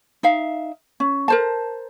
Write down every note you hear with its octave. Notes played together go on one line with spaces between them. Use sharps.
D#4 E5 F5
C#4
A#4 C5 A5